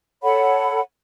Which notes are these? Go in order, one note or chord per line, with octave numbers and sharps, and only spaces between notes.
A4 C#5 F#5 B5